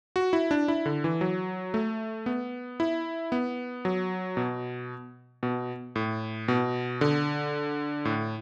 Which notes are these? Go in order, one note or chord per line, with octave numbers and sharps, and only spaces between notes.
F#4
E4
D4
E4
D3
E3
F#3
A3
B3
E4
B3
F#3
B2
B2
A2
B2
D3
A2